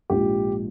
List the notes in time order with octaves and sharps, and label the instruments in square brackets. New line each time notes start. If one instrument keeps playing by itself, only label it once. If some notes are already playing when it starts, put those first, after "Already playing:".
[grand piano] A#1 G#2 F3 G4